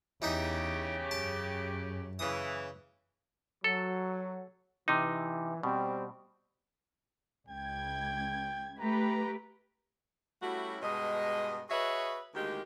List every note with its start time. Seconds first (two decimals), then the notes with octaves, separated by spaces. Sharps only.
0.22 E2 C#3 E3 D#4 G4 E5
1.11 F#2 A5
2.19 C#3 E3 D#6
3.64 F#3 A4
4.88 C3 E3 D#4
5.63 B2 G3 C4
7.48 C#2 G5 G#6
8.80 A3 G4 B4 A#5
10.42 G3 A3 C#4 E4 F#4
10.82 G2 B2 G#3 D#5
11.70 F#4 G#4 B4 C#5 D#5 E5
12.34 D2 D#3 G#3 A#3 G4